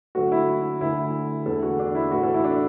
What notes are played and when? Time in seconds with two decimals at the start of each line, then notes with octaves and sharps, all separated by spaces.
0.15 D2 D3 F#3 A3 F#4
0.32 E4
0.80 D2 D3 A3 E4
1.46 E2 D3 A3 A4
1.62 F#4
1.79 D4
1.95 E4
2.11 A2 E3 A3 F#4
2.23 A4
2.34 E4
2.44 D4